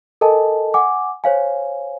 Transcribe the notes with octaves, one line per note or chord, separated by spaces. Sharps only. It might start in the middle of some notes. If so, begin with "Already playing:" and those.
A4 A#4 D#5 G#5 A5
F#5 G#5 D6
C5 C#5 F5 G#5